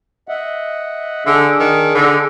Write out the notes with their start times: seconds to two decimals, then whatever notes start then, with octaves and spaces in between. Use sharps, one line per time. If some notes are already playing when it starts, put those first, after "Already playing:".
0.29 D#5 E5 F#5
1.27 D3 D4 G#4
1.60 D#3
1.95 D3